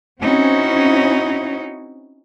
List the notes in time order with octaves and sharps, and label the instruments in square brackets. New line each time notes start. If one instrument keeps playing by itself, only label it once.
[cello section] C4 C#4 E4 [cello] D#4 F#4